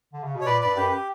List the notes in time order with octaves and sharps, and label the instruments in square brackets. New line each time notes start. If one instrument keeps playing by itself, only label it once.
[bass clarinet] D3
C#3
B2
[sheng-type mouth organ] C#5
[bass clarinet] A#2 [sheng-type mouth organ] B4 D5
[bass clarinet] G2 [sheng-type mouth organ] B4 D5
[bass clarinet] F#2 [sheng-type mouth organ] G4 B4
[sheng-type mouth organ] G4